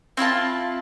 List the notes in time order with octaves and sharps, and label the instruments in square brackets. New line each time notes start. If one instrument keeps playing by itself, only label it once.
[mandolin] C4 E4 F4 A5